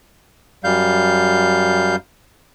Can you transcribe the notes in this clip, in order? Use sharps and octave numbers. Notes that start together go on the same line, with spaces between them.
F#2 G3 F5 G6